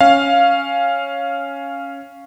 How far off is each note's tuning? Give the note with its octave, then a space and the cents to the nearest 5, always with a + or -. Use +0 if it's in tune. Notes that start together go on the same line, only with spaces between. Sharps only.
C#4 +0 F5 +0